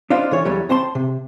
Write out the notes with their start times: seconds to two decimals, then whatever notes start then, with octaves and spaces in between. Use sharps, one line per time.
0.10 D4 D#4 F4 C5 F5
0.31 D3 E3 C#5
0.45 E2 F#3 G3
0.69 C4 C5 A5 C6
0.95 C3